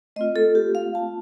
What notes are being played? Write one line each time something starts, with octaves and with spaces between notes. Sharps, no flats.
A3 C4 F4 D#5
A4
G4
F5
A5